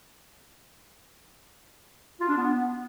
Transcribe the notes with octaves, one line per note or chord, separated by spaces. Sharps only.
F4
D4
B3